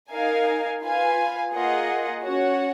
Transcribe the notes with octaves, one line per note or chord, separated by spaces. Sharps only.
D#4 A#4 F5 G#5
F4 B4 F5 G#5
A#3 F4 G#4 D#5 F#5
C#4 F#4 C#5 F#5